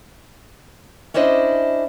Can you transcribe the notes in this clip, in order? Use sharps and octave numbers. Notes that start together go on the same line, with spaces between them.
C#4 D4 E4 C5 D#5